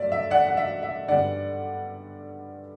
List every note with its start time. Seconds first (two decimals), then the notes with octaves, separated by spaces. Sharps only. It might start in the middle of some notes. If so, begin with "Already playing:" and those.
Already playing: G2 F#3 A3 D5 E5
0.12 E5
0.31 D5 F#5
0.47 F#5
0.57 E5
0.83 E5
1.08 G2 D3 G3 B3 D5 F#5